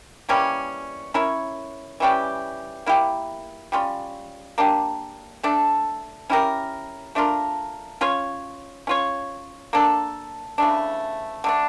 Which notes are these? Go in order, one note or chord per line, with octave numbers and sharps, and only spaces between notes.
E3 G3 A#3 C#4
C#4 E4 A#4 C#5
E3 G3 C#4 G4
A#3 E4 G4
G3 C#4 F4
A#3 D4 G4
A3 D4 A4
C#4 E4 G4 A#4
A3 D4 F4 A#4
C#4 F4 C#5
C#4 F4 C#5
A#3 D4 A4
C#3 E3 A3 D4
D3 A3 D4